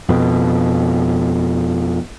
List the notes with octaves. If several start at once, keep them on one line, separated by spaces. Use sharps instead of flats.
F2 B2